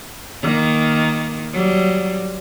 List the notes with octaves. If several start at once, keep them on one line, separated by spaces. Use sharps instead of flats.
D#3 A#3
F#3 G3